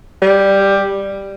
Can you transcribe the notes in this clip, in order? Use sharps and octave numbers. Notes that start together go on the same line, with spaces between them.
G3